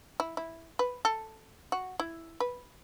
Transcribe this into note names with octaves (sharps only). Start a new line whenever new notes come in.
E4
E4
B4
A4
F#4
E4
B4